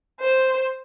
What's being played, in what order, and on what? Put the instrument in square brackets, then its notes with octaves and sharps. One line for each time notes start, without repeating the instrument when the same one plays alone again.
[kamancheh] C5